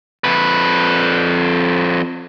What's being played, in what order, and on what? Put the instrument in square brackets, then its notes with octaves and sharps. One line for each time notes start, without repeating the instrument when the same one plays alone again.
[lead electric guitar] F2 B4